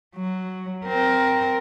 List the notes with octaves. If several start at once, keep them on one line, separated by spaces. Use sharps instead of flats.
F#3
C4 A#4